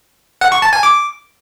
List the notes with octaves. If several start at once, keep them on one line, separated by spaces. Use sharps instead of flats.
F#5
C#6
A5
G#5
D6